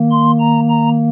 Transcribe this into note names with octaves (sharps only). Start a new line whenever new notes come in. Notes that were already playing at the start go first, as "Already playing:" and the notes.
Already playing: D#3 A#3
C6
A#5
A#5